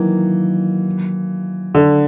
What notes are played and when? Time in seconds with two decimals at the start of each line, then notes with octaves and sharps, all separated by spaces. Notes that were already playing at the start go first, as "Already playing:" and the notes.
Already playing: D#3 E3 F#3 A#3
1.75 D3